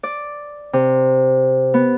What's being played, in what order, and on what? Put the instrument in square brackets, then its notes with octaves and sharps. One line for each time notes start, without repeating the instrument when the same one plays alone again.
[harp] D5
C3
B3